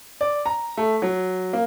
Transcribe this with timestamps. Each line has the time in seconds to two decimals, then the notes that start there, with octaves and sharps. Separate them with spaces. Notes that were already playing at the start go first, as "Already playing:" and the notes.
0.21 D5
0.46 A#5
0.77 A3
1.02 F#3
1.53 A#3